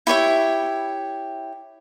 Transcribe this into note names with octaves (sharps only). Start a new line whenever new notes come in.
E4 G4 C#5 E5